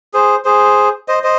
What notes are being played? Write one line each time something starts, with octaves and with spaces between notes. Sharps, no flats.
G#4 C5
G#4 C5
C5 D#5
C5 D#5